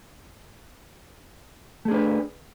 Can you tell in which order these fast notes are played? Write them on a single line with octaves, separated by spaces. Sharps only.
A3 G#4 D4 B4